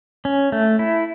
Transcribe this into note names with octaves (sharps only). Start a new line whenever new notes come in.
C#4
A3
E4